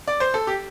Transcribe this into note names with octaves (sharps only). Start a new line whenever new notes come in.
D5
C5
A4
G4